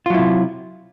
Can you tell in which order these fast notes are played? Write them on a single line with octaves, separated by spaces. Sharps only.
F4 F#3 E4 C3